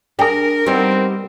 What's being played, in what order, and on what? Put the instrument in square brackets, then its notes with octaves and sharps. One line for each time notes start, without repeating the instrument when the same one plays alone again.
[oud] D4 [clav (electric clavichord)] G4 G#4 [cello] A#4
[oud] G3 B3 D#4 [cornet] C4